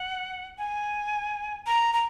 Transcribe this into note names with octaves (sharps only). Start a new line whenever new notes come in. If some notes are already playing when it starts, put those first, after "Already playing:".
Already playing: F#5
G#5
A#5
A#5